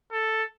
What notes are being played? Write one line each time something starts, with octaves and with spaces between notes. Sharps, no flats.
A4